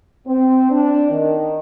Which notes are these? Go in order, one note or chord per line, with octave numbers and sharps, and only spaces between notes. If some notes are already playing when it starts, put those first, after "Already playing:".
C4
D4
D#3